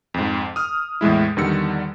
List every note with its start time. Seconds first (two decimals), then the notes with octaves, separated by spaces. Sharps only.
0.14 F2 G#2
0.56 D#6 F6
1.01 E2 A2 G#3 E4
1.37 E2 D3 D#3 G3 E6 C#7